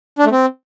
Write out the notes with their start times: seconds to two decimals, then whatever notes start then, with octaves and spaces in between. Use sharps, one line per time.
0.19 D4
0.25 A3
0.32 C4